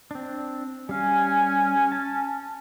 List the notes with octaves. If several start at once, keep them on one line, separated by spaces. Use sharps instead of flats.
C4 D4
G3 C#4 F5 G#5
A5